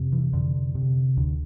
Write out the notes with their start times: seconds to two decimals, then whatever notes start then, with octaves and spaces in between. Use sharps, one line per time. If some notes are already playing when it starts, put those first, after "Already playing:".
Already playing: F2 C3
0.12 E3
0.33 F2 D3
0.75 C3
1.17 D2 D3